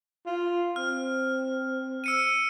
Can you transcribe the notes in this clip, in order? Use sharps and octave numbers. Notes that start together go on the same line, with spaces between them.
F4
C4 F6
E6 C#7 D#7